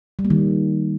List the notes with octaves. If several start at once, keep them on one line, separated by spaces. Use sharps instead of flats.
G3
A#3
D#3